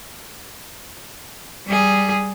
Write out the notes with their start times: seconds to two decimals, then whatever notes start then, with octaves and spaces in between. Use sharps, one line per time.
1.66 G3 G#4